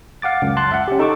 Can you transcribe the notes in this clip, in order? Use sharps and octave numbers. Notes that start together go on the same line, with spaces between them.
F5 F#5 D6 A6
C#2 F#2
A5 C6 F#6 A6
E5 F#5
C#4 G4
D#4 A4 A5 C#6 D6